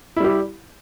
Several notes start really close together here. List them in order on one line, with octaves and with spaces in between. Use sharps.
E4 G3 G4